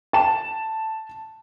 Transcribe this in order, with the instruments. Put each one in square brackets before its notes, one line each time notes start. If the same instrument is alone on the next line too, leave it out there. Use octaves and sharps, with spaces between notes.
[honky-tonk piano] A5 E7